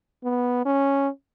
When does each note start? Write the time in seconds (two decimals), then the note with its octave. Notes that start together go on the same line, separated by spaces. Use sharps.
0.24 B3
0.65 C#4